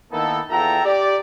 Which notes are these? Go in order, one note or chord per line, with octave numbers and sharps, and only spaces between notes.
D#3 A#3 B3 D#4 E4 A4
E2 F4 A4 E5 G5 A#5
G4 D5